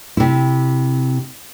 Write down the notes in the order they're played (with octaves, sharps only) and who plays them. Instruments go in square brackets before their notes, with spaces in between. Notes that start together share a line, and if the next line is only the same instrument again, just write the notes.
[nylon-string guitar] C3 E4